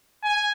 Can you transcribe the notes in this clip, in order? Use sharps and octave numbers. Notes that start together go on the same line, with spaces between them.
G#5